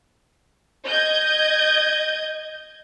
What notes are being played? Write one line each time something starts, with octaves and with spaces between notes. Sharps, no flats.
D#5 G6 G#6